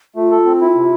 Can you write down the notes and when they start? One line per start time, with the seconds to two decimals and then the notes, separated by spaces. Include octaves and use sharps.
0.16 A3 F4
0.31 A4
0.45 C4
0.61 E4
0.75 C3